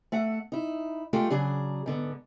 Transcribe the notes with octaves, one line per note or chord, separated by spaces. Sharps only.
A3 E5 F#5
D#4 E4
G#3 A3 F4 G4 A4
C#3 F#3 D4 G#4
G#2 D3 B3